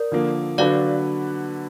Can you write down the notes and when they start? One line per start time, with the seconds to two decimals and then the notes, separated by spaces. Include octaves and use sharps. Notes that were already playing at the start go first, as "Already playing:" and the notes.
Already playing: A#4 D5
0.12 D3 F3 A#3
0.58 D3 F#3 D4 F#4 B4 D5 F5